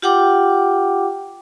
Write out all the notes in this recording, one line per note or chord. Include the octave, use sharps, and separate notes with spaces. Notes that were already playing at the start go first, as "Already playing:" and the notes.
F4 G4 F#5 G5 D6